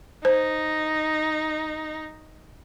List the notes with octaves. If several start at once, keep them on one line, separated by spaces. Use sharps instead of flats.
D#4 C5